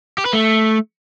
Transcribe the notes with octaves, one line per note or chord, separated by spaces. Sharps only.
G4
B4
A3